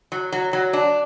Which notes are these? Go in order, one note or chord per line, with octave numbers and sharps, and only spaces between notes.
F#3
F#3
F#3
D4